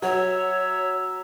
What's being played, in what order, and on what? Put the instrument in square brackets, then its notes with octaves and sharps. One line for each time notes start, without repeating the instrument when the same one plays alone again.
[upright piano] F#3 [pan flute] C#5 [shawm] E5